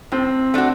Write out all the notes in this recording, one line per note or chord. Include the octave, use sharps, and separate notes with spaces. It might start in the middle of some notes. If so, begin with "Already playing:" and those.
A2 C4
A3 D4 F#4